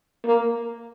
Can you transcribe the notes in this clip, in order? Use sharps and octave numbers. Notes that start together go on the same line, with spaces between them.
A#3